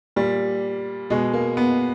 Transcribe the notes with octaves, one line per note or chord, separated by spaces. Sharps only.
A#2 G3
B2 G#3
A#3
B3